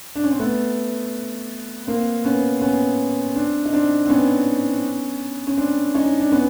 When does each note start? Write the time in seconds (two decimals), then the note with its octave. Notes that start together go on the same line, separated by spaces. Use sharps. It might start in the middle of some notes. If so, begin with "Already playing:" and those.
0.15 D4
0.24 C#4
0.31 C4
0.40 A3 B3
1.87 A#3 C4
2.24 B3 C#4
2.62 B3 C#4
3.35 C4 D4
3.65 D#4
3.73 C4 D4
4.06 C4
4.10 B3 C#4
5.47 C#4
5.57 C4 D4
5.95 C#4 D#4
6.20 D4
6.32 B3 C#4